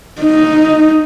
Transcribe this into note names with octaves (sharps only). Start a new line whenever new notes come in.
D#4